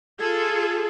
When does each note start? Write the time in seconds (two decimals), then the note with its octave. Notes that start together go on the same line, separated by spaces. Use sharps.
0.20 F4 G#4 A4